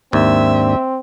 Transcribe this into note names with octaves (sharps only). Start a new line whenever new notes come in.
D#2 G#2 C4 D4 E5